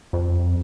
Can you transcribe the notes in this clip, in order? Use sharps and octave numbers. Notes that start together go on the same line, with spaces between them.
F2